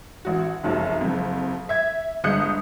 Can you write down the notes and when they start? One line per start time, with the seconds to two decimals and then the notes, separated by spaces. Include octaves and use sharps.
0.25 A1 F#4
0.63 F1 B1 F#2 C#3 F3
1.01 F#1 F2
1.69 E5 G#6
2.24 G1 G#3 D#6 F#6 G6 C#7